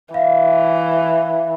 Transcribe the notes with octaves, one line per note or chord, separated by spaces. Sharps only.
E3 E5 F5